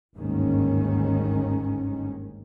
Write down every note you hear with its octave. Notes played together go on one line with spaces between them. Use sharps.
G1 D#2 G#2 D#3 C#4